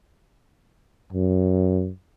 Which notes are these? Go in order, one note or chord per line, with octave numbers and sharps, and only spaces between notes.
F#2